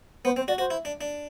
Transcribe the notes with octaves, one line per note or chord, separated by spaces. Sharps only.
B3 C5
C4 C5
F#4 D5
F#4 C5
E4
D4
D4